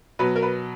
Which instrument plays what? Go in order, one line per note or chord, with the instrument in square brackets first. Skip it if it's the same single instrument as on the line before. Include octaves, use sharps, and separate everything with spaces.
[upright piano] B2 F#3 B4
A#4
B4